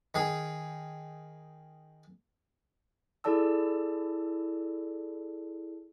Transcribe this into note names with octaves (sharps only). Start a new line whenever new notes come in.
D#3 G#4
E4 G#4 A4 D5 A5 E6